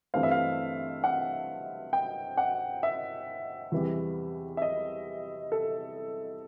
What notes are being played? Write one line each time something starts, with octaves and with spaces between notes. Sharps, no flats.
G2 E3 A3 C4 F5
E5
F5
F#5
G5
F#5
E5
E2 C3 E3 G3
E5
D#5
A4